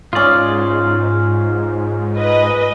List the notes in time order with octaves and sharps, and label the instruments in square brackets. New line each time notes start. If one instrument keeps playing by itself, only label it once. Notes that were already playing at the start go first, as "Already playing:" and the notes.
[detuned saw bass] G#2 [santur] C#4 D#6 [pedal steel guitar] F4 D5
[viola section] B4 D#5